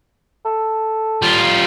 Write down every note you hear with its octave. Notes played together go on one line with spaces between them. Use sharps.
A4
G3 F4